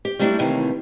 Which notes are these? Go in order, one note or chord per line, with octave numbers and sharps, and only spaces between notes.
G4
G3 A3 A#3 D4 E4
D#2 A2 C3 D#3 E3